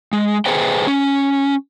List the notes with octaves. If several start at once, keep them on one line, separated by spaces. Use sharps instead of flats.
G#3
G#4 B4 C5 G5
C#4